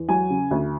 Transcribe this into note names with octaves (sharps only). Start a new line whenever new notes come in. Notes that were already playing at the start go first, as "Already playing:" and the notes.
Already playing: E2
F#3 G#5
C#3
D2